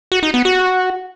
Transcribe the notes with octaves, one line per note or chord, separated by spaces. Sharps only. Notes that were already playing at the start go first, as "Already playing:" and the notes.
F#4
D#4
B3
F#4